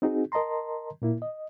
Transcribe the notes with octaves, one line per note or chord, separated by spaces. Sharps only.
C4 D#4 F#4 G#4
A#4 D#5 A5 A#5 C6
A#2 A#3 E4
D#5